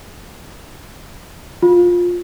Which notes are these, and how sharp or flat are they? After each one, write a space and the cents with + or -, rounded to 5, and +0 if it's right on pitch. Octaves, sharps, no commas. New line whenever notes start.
F4 +15